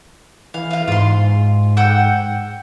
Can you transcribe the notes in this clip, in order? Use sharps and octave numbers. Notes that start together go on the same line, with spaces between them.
E3 F5
F4 F5
G#2 F4 C6
F#5 G5 E6